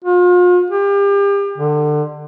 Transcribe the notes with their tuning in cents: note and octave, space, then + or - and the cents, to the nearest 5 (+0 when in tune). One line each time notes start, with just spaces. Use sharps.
F4 +40
G4 +35
D3 +30